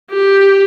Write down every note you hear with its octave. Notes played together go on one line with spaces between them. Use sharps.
G4